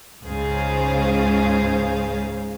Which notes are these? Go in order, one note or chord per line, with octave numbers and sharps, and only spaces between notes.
C#2 G#2 C#3 G#4 C5 F5